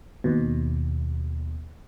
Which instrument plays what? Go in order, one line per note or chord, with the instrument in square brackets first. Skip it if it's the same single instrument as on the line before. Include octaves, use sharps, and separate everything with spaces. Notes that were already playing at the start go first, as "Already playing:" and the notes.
[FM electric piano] D#2 B2